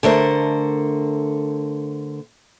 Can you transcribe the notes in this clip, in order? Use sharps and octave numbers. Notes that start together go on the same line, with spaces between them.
D3 A3 A#4 C5